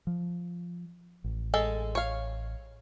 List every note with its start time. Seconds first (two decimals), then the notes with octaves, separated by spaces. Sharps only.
0.07 F3
1.24 A1
1.54 G#3 A4
1.95 C#5 F5